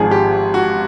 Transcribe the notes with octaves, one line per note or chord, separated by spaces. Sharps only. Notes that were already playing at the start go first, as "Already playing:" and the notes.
Already playing: G#1 G#2 F3 G#4
G4
F#4